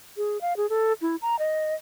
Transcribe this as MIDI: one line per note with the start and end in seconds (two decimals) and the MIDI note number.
0.17 0.40 68
0.41 0.56 77
0.57 0.69 68
0.70 0.93 69
1.02 1.16 64
1.22 1.38 82
1.39 1.75 75